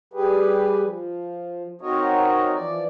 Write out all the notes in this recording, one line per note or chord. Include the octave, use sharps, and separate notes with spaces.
G3 G4 G#4 B4
F3
C4 D#4 F#4 A#4 C#5 D#5
E3 F3 D5